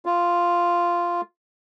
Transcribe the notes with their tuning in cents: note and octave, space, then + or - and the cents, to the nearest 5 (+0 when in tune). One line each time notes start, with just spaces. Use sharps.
F4 -5